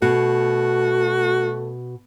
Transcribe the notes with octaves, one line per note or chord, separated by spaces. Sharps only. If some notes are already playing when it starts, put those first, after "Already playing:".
B2 A3 F#4